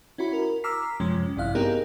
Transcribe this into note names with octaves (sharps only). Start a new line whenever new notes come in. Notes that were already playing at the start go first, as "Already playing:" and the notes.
C#4 E4 F#4 B5
A#4
A#5 D6 E6 F6 B6 C7
F#2 C3 F3 G#3 C#4
A1 G2 C3 E4 F5 F#6
B3 C4 D#4 G4 G#4 A#4